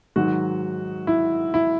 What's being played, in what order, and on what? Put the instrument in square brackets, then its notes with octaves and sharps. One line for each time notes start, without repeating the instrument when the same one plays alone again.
[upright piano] G#2 D#3 F#3 F#4
E4
E4